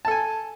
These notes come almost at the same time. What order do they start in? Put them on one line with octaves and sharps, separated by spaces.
A5 A4 G#5